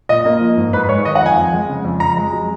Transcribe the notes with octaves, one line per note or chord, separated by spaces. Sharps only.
A#2 D#5
A#3
F3
G#2
G#2 B4
G#3 C#5
D#3 D#5
F#5
F2 G#5
F2
G#3
C#3
F2
F2 A#5
G#3
F#3